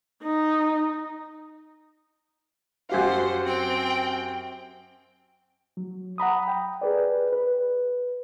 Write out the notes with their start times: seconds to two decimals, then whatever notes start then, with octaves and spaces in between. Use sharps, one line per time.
0.23 D#4
2.89 F#2 G4 C5 F5 F#5
3.45 C4 G5
5.77 F#3
6.18 F#5 A#5 B5 D#6
6.48 G5
6.82 G#4 B4 D5
7.32 B4